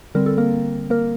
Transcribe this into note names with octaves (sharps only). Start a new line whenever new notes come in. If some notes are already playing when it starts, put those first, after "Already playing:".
D3 G3 C4 A#4
A4
A#3 A#4
A#3 A#4